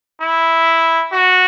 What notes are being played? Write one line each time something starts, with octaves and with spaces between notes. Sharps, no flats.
E4
F#4